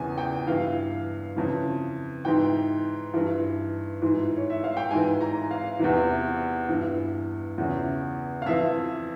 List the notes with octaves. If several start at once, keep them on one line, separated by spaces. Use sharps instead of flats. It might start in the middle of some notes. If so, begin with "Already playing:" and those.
Already playing: E2 C#3 E3 G#5
G5
G2 E3 F5
F2 C#3 E3
G#2 E3 G5
G2 E3
G#2 E3
C#5
E5
F5
G5
G#2 E3 G#5
A#5
F5
E2 C3 E3
G2 E3
E2 C#3 E3
F5
F2 E3 E5